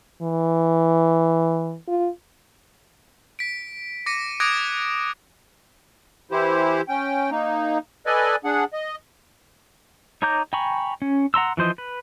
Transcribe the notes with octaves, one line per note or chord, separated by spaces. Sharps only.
E3
F4
B6 D7
D6 A#6 C#7 D#7
D6 D#6 F#6 G#6 A#6 D7
E3 E4 G4 C5
C#4 G5
A#3 D#4
A4 B4 D5 D#5 G#5
D4 G#4 F#5
D#5
D#4 C#5 A#5 D6 G6
G5 G#5 A#5 B5 C#6
C#4
F#5 A#5 C6 E6
E3 F3 C5 D#5
B4